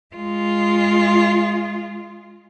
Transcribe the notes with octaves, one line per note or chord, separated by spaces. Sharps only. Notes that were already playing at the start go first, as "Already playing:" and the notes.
G#3 F4